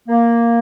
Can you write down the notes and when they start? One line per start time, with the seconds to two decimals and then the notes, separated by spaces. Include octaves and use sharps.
0.08 A#3